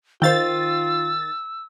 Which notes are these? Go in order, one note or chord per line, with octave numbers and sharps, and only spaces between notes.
D#3 F4 C5 F5 G5 E6 A6